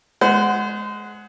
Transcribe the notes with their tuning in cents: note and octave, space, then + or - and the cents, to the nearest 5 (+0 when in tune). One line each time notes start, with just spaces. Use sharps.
G#3 +20 C5 -30 F#5 +0